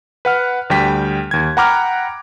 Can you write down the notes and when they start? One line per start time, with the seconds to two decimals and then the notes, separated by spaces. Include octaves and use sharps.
0.25 B4 F#5 F6
0.70 D2 G3 G5 B6
1.31 D#2 G#6
1.57 F#5 G5 A#5 B5 D6 F6